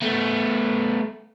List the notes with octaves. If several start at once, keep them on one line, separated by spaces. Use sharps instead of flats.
A3 B3